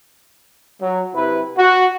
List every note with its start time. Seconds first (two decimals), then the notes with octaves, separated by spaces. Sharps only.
0.82 F#3
1.15 C3 E4 B4
1.57 F#4